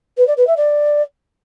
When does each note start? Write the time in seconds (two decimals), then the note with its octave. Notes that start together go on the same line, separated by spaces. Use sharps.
0.17 B4
0.27 D5
0.37 B4
0.47 E5
0.57 D5